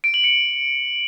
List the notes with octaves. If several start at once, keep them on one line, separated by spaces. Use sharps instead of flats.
D7
F#7
C#7